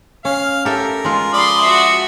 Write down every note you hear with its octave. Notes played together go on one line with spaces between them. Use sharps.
C#4 F5
G4 A4 A#4 E5
G#3 F4
F3 D5 B5 C6 D#6
F#4 E5